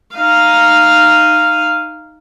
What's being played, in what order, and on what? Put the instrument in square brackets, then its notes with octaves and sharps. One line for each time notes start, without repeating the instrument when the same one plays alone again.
[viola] D#4 F5